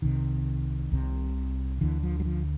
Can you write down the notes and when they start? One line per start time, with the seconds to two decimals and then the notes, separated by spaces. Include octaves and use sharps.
0.02 C2 C3 D#3
0.92 C2 C3
1.81 D2 D3 E3
2.03 F3
2.20 F#3
2.25 F3